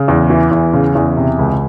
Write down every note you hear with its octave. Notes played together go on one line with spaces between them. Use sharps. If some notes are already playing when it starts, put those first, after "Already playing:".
Already playing: C#3
E2
E3
E2
C#3
E2
C3
C#2